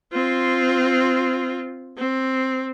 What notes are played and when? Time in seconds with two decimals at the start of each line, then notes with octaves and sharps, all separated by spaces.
0.12 C4 F4
1.97 C4